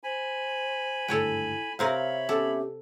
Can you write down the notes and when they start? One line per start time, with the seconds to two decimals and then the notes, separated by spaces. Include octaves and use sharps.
0.04 C5 G#5 B5
1.08 G#1 D2 G2 E4 A4 C#5 G5
1.79 C3 C4 A#4 C#5 E5 F5 B5
2.29 B3 C#4 G4 A4